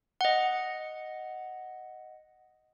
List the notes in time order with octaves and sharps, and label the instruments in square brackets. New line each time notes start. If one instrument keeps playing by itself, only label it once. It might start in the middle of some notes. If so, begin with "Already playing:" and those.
[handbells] D#5 F#5